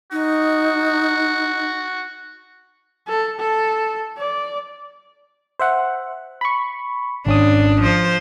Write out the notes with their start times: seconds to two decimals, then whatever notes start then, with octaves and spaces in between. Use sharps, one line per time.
0.12 D#4 F#4
3.08 A4
3.39 A4
4.17 D5
5.60 C5 E5 F#5
6.41 B5 C#6
7.26 G#1 C#4 D4 D#6
7.82 F3 C5